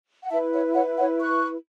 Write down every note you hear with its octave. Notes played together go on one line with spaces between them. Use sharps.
F#5
E4 B4 E5 A5
C#5 F#5
C#5 F#5
C#5 F#5
C#6 F#6